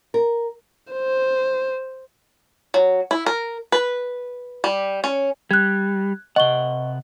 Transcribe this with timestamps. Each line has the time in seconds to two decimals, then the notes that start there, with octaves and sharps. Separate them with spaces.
0.14 A#4
0.93 C5
2.74 F#3
3.11 E4
3.26 A#4
3.72 B4
4.64 G3
5.04 C#4
5.51 G3 F#6 G#6
6.36 C3 D#5 F#5 C#6 G7